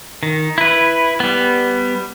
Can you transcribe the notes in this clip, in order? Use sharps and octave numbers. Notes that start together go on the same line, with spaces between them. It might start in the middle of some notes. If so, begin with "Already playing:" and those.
D#3
E4 B4
G3 B3